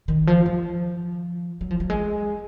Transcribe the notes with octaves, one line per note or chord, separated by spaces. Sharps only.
D#3
F3
F3
F#3
F3
F#3
G#3